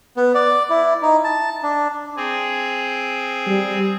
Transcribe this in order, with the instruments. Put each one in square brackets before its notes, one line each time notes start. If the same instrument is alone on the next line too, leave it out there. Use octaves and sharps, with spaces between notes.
[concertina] B3
D5
E4
D#4
A5
D4
[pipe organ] C4 G#4
[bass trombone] G3